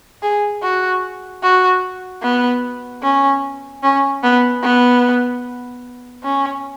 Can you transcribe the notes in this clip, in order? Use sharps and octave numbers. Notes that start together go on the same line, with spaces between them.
G#4
F#4
F#4
B3
C#4
C#4
B3
B3
C#4